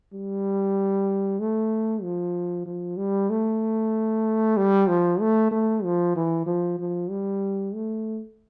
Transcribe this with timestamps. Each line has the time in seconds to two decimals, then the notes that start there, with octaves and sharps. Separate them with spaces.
0.13 G3
1.40 A3
2.03 F3
2.66 F3
2.97 G3
3.30 A3
4.57 G3
4.88 F3
5.20 A3
5.51 A3
5.84 F3
6.16 E3
6.46 F3
6.79 F3
7.10 G3
7.74 A3